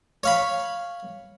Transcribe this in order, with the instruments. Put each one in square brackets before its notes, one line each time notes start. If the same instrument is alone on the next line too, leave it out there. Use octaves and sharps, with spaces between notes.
[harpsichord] C#5 F5 B5